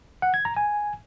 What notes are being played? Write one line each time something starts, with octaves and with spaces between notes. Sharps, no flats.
F#5
G#6
A#5
G#5